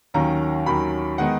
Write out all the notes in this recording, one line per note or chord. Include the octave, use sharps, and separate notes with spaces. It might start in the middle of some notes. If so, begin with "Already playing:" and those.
D#2 D#3 F#3 C#4 A#5
D#2 D#3 F#3 C#4 B5
D#3 G#3 B3 D#4 F#5